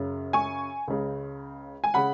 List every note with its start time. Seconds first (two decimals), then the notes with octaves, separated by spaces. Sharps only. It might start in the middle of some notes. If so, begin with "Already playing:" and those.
Already playing: F#2 C#3
0.33 G#5 C#6
0.88 C#2 C#3
1.84 G#5
1.94 C#3 F#5 B5